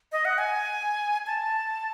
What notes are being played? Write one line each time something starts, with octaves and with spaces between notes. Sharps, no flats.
D#5
F#5
G#5
A5